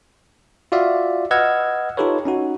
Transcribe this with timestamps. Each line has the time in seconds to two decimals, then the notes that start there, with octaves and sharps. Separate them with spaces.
0.72 F4 F#4 D5 E5 F5
1.31 B4 D#5 F#5 E6 F6 G#6
1.97 D#4 F4 G4 A4 B4 C#5
2.25 C#4 D#4 F#4